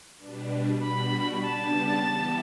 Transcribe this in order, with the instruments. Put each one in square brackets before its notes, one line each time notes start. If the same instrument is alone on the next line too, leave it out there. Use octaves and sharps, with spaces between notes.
[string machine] B2 G3 B3 D4
[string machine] B2 G3 D4 F#4 [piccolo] B5
[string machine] C#3 G3 B3 D4 G4 [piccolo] A5
[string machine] E3 G3 B3 E4 G4